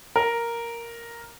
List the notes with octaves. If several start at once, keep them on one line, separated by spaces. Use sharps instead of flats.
A#4